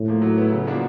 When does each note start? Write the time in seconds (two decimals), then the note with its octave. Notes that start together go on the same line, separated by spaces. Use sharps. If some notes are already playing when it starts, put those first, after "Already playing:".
Already playing: A2
0.08 F3 A#3
0.22 F#3
0.37 B3 E4
0.52 C#3
0.67 F3 A#3 D4 F#4